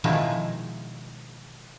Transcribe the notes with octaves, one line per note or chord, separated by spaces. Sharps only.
B2 D#3 F3 G#3 D#4 E4